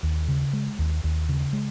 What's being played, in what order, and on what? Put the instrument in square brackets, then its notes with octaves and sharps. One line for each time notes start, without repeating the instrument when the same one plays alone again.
[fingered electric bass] D#2
C#3
G#3
D#2
D#2
C#3
G#3